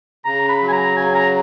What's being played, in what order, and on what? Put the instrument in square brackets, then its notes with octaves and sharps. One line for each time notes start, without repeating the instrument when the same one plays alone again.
[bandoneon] C#3 [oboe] A#5
[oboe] B5
[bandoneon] F#3
[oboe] G#5
A#5
[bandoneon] C#3 [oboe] G#5
[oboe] A#5